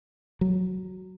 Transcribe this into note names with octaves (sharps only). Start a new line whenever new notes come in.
F#3